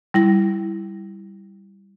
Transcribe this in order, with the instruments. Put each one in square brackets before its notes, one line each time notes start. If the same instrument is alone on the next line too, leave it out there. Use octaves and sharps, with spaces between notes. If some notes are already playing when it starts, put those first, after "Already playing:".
[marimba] G3 E4 A#6